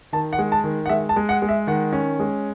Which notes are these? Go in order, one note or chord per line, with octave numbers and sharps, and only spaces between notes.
D#3 A5
F#5
G#3
A5
D#3
F#5
G#3 E5
A5
G#3
F#5
G#3
E5
D#3 F#5
C#4
G#3